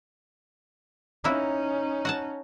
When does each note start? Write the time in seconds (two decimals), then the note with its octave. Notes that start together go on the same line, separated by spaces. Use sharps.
1.24 A#3 C#4 D#4 E4 F#4
2.05 F#4 F#5 A5